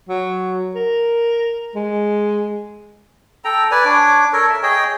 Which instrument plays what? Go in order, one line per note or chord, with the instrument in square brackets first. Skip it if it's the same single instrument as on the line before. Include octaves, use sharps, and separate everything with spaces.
[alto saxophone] F#3
A#4
G#3
[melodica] A4 G5 A#5
B4 D5 G#5
D4 C#5 D6
A4 A#4 C#5
E5
G#4 C#5 D#5 G5